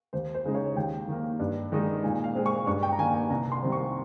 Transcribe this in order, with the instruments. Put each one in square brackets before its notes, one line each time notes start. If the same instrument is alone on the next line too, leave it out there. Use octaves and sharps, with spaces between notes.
[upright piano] D#2 C5
C5
C#3 G#3 D#4
C#5
D#2 G5
D#3 A#3
G2
D#3 G#3 D#4
A#2 G#5
F5
G#3 C4
C#6
G2 C#6
G5
A#5
D#3 A#3 G#5
G#5
C2 A#5
C6
C3 D#3 G3 C4
C#6